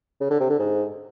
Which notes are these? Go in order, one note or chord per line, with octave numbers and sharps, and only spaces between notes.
C#3
D3
C3
D3
G#2